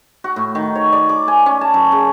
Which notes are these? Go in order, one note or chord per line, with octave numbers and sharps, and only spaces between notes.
F#4
A2
D#3
C#5
D5
D6
G#5
C#4
A5
F#2
C#3